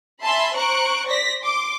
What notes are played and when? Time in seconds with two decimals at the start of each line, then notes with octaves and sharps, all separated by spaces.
0.23 E5 G#5 A5 B5 C6
0.56 C5 A#5 C#6 F#6 D7
1.06 C5 D5 A#6 B6
1.41 C6 D6